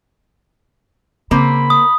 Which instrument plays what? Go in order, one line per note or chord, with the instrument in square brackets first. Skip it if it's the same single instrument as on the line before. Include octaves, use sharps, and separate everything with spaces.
[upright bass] C#3 [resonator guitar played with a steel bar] A#3 C4 [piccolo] B5
[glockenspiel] D#6